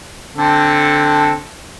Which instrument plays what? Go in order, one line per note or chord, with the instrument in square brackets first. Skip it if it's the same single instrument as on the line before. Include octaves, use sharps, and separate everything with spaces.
[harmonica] D3 C4 A4